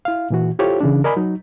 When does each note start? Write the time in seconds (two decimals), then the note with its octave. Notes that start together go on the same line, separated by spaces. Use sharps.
0.05 E4 F5
0.30 A#2 E3 F#4
0.59 E4 F4 G4 A4 C5 C#5
0.81 C#3 E3 C#4 D4
1.04 A#4 D5 D#5 G#5 B5
1.17 F#3 D#4